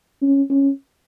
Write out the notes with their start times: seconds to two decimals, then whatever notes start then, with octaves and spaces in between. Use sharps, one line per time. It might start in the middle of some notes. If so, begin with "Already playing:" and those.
0.22 C#4
0.50 C#4